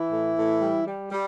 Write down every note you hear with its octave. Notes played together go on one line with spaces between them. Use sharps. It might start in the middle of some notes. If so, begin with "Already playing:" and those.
Already playing: E3 E4
A2
A2
G3
G3
G3